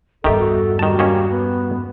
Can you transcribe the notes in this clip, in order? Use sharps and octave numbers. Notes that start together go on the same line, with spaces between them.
E2 G2 D#3 G4 A4 E5
F#4
D#3 G3 F#4 A5
D#3 A#3 C#4
B3